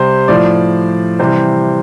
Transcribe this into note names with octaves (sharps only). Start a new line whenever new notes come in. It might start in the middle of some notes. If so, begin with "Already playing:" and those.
Already playing: C3 G3 C5
A2 F3 D5
C3 E3 G3 C5